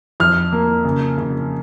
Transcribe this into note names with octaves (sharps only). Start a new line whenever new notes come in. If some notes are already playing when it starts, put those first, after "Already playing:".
F2 F6
A#3
C#3
C#3